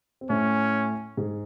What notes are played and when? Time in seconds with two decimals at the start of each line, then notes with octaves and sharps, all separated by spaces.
0.21 C4
0.29 A2 A3 C#4
1.17 G#2 G#3